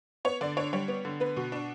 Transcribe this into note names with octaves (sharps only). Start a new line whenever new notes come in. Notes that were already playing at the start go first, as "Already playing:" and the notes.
B3 C#5
D3 D5
D4 C#5
G3 C#5
B3
D3
B3 B4
B2
D4